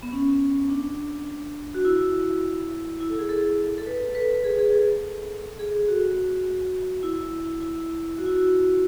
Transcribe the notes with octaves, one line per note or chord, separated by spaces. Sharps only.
B3
C#4
D4
F#4
E4
E4
A4
G#4
A4
A4
B4
A4
B4
A4
G#4
G#4
A4
G#4
F#4
E4
E4
F#4
E4
F#4